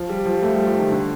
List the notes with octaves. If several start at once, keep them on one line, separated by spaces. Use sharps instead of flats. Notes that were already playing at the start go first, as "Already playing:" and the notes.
Already playing: F3
G3
F3
A3
G3
F3
D#3
D3